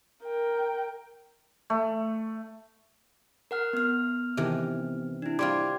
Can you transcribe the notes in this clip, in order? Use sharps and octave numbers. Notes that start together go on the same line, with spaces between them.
A#4 G5
A3
A#4 F#5 F6
B3 F6
C3 D#3 E3
D4 E4
G3 C4 F4 C6 D6 G#6